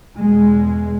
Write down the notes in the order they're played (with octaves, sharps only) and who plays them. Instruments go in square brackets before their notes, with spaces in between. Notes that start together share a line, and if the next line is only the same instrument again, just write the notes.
[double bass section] E2 B2 G#3